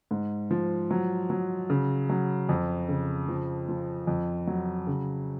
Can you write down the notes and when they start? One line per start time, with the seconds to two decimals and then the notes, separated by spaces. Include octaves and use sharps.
0.11 G#2
0.51 F3
0.91 F#3
1.30 F#3
1.70 C#3
2.10 F#3
2.49 F2
2.89 C#3
3.28 F3
3.69 F3
4.07 F2
4.47 F#3
4.87 C#3